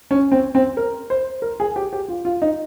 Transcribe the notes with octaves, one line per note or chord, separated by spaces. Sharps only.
C#4
C4
C4
A#4
C5
A#4
G#4
G4
G4
F4
F4
D#4